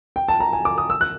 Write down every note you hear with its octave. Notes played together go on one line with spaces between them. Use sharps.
G5
A5
A#5
G#5
D6
D#6
E6
F#6